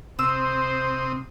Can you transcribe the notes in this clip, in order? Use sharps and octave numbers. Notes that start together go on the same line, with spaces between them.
C3 C4 C5 D#6 E6